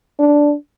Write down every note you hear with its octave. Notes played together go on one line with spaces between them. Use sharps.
D4